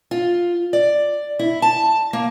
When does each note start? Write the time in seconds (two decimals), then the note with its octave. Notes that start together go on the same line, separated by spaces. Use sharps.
0.11 F4
0.73 D5
1.39 E4
1.62 A5
2.13 A#3